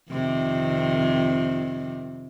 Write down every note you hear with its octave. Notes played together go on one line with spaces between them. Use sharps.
F2 C3 D#3